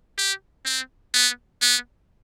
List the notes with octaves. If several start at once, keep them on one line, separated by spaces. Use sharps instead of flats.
G4
C4
B3
B3